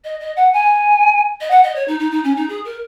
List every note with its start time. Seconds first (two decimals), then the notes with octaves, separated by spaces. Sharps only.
0.04 D#5
0.20 D#5
0.36 F#5
0.53 G#5
1.40 D#5
1.50 F#5
1.63 D#5
1.75 C#5
1.87 D#4
1.99 D#4
2.11 D#4
2.24 C#4
2.36 D#4
2.49 G#4
2.64 A#4